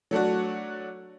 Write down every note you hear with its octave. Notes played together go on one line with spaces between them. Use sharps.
F#3 A3 D4 F#4